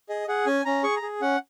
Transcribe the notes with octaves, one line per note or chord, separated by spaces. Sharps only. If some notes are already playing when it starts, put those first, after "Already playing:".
G#4 D#5
G#4 F#5
C#4 G#5
C#4 A#5
G#4 C#6
A#5
G#4
C#4 F#5